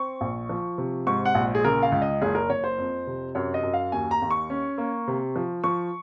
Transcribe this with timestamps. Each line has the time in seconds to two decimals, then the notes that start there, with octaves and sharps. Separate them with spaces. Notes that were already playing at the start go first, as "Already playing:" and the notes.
Already playing: C4 C#6
0.21 A#1
0.49 F3
0.78 C3
1.07 G#2 C#6
1.25 F#5
1.35 A#1
1.55 G#4
1.65 C#3 A#4
1.83 F5
1.92 C#2
2.02 D#5
2.22 F#1 G#4
2.35 A#4
2.49 F#1 C#5
2.64 C5
2.78 F2
3.07 C3
3.35 F#2 C#5
3.54 D#5
3.63 F#2
3.73 F5
3.92 D#2 G#5
4.11 A#5
4.22 D#2
4.31 C#6
4.50 C#4
4.78 A#3
5.08 C3
5.36 F3
5.64 F3 C#6